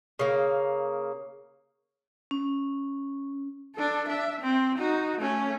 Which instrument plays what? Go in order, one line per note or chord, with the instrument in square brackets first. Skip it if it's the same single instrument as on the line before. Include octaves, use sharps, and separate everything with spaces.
[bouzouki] C#3 A#3
[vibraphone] C#4
[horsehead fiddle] D4 A4
D4 E5
C4
D#4 F#4
A3 C#4